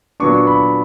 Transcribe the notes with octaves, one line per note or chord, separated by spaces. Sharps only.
A#2 F#3 B3 D4 C#6
B5